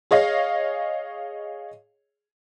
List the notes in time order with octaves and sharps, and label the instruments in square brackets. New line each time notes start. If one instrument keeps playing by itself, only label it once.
[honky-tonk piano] G#4 C#5 D#5 F5